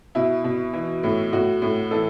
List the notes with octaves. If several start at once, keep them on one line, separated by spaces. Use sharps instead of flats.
B2 E4
B2
E3
A2
A2 F#4
A2
E3 A4